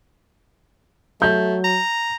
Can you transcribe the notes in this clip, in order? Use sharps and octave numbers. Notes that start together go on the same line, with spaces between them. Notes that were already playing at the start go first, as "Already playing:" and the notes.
F#3 A3 G6
A#5